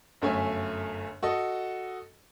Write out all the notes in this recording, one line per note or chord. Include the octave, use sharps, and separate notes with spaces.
G1 F#2 A3 C#5 E5 G#5
F#4 A4 D#5